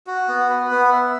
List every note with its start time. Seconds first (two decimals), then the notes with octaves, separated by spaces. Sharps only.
0.07 F#4
0.28 B3
0.50 B4
0.71 B3
0.92 E5